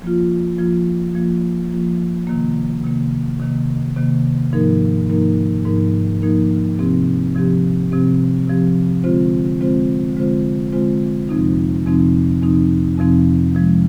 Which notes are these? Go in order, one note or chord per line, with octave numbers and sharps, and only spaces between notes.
F3 A#3 F4
F3 A#3 F4
F3 A#3 F4
F3 A#3 F4
C3 D#3 A#3
C3 D#3 A#3
C3 D#3 A#3
C3 D#3 A#3
G#2 F3 A#3 D#4 A#4
G#2 F3 A#3 D#4 A#4
G#2 F3 A#3 D#4 A#4
G#2 F3 A#3 D#4 A#4
C3 F3 C4 G4
C3 F3 C4 G4
C3 F3 C4 G4
C3 F3 C4 G4
D3 G#3 C4 F4 C5
D3 G#3 C4 F4 C5
D3 G#3 C4 F4 C5
D3 G#3 C4 F4 C5
F2 C3 F3 C4 D#4
F2 C3 F3 C4 D#4
F2 C3 F3 C4 D#4
F2 C3 F3 C4 D#4
C3 F3 G#3